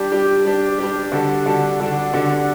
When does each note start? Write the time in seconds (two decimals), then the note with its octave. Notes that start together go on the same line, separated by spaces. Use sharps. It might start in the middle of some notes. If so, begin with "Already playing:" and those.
Already playing: G3 D4 G4
0.11 G3 D4 G4
0.45 G3 D4 G4
0.78 G3 D4 G4
1.12 D3 G3 D4 F#4 A4
1.46 D3 G3 D4 F#4 A4
1.80 D3 G3 D4 F#4 A4
2.13 D3 G3 D4 F#4 A4